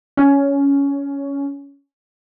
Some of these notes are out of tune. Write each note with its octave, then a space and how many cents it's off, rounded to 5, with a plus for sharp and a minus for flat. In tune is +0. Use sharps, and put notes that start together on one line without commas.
C#4 +15